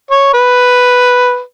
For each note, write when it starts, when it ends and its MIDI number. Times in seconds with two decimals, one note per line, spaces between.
0.11 0.32 73
0.34 1.41 71